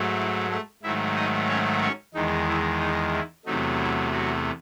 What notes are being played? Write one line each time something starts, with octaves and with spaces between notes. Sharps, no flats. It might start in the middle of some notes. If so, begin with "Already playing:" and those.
Already playing: G#2 F#3 A3
E4
A3 A4
G#2 D#3 F#3 A3 E4 E5
D#4 D#5
C#4 C#5
C#4 C#5
E2 D#3 G#3 D#4
E4
D#4
E4
E2 C3 F#3 A3 D#4
E4
F#3 F#4